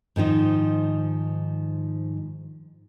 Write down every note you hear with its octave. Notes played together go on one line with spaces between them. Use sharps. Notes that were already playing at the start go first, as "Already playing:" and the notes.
G#2 D#3 F3 D#4